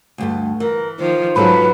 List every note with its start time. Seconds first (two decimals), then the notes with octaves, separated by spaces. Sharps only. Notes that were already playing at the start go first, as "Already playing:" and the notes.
0.18 D2 G2 A3
0.60 E3 A#4
0.99 D#3 F3 C5
1.36 G#2 F3 F#3 C#4 A4 B4